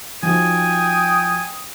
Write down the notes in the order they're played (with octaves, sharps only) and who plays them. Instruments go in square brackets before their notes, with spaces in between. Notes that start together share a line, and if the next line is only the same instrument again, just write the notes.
[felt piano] F3 D#4 F#4 [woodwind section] G5 D#6 [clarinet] G#5